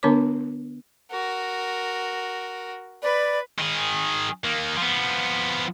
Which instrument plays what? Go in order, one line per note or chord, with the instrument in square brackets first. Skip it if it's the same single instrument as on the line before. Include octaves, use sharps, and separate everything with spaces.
[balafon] D3 B3 D4 A#4 C#5 D6
[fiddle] F#4 A#4
[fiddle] B4 B5 [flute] D5
[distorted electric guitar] D#3 G#4
D#3 A#3
F3 B3